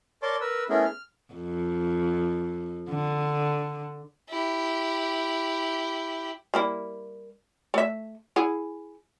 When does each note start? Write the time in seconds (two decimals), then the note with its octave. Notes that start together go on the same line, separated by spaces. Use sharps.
0.22 A#4 C#5 D5 A5 C6 D6
0.41 A#4 B4 E6
0.69 A3 B3 C#4 E4 G#4 A#4
0.85 F6
1.33 F2
2.89 D3
4.30 E4 G4
6.54 G3 A#3 E4
7.74 A3 E5
8.36 E4 G#4 F#5